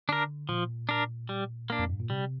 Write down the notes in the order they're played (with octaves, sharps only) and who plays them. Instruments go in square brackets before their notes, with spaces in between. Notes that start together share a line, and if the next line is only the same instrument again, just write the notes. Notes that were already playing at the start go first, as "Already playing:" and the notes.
[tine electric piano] D3 [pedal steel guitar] D4 A#4
[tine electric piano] A#2 [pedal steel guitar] F3
[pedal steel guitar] D4 A#4
G3
A#3 D4
[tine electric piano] F2
G2
A#2
[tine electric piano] C3 [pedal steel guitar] G3